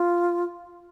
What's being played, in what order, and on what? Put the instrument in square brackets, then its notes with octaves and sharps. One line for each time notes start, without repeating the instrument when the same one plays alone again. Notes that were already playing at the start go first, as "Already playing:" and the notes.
Already playing: [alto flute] F4